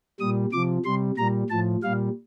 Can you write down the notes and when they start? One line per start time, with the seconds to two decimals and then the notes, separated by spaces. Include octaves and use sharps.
0.20 A#2 G3 D#6
0.52 C3 F3 D6
0.85 C3 G3 C6
1.18 A#2 G3 A#5
1.50 A2 F3 A5
1.83 A#2 G3 F5